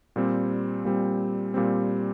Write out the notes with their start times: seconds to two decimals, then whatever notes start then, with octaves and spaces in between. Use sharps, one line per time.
0.16 A#2 G3 C4
0.85 A#2 G3 C4
1.54 A#2 G3 C4